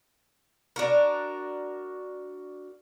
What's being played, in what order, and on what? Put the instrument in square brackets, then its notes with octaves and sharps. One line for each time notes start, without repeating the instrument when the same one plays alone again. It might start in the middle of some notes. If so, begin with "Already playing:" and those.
[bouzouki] D4 F#4 A#4